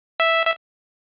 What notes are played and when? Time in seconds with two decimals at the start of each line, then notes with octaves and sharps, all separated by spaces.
0.20 E5
0.46 E5